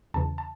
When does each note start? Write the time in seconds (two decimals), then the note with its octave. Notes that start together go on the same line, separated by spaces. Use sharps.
0.14 E2 C#3 E3 A5
0.38 A5